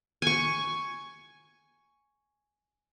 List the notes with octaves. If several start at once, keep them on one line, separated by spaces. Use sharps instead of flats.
G#5 C#6